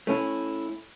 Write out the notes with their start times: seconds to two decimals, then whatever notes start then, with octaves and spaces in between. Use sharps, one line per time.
0.07 A3 C#4 E4